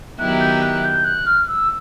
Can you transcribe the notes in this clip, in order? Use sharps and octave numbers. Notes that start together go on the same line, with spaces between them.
D#3 F#3 B3 E4 G4 F#6
G6
F#6
G6
F#6
F6
E6